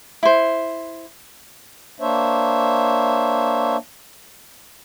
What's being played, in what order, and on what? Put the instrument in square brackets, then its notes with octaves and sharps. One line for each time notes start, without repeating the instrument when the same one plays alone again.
[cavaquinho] E4 C5
[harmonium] A#3 D4 C5 C#5 E5